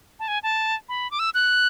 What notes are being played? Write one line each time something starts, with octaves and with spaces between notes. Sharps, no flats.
A5
G#5
A5
B5
D6
E6
F#6